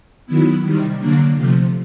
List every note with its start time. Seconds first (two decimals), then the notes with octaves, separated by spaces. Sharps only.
0.26 D#3 F#3 B3 E4
0.63 C3 D#3 G3
0.99 D3 F#3 A#3 D4
1.35 C3 F3 A3